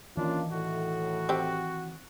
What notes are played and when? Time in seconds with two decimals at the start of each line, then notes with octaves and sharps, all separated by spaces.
0.17 D#3 E3 A#3 C#4 D4 F4
0.51 A2 F#4
1.29 C4 G4